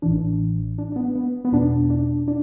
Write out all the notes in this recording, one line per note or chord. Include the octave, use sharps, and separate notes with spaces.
A1 A2 E3 D4
D4
D4
B3
B3
B3
E2 B2 D4
D4
D4